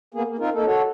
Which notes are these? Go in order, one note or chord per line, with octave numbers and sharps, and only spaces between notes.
A#3 B3 G#4
A#3
C4 D#4 F4 A#4
A3 A#3 D#4 A4
F#4 A4 C#5